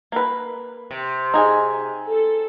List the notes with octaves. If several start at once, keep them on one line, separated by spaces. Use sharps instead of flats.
A#3 B4
C3
D#4 G#4
A4